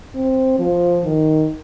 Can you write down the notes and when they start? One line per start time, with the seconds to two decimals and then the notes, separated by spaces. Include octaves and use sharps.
0.15 C4
0.59 F3
1.04 D#3